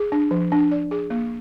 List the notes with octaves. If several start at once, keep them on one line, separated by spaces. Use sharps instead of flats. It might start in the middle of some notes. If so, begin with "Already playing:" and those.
Already playing: G#4
D4
F3
D4
D5
G#4
A#3